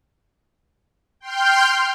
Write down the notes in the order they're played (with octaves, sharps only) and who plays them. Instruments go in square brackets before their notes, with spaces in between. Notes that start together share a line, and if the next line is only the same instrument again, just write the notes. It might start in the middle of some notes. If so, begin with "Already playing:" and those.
[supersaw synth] G5 C6 F6 G6